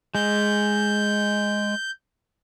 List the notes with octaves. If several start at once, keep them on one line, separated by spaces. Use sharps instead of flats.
G#3 G6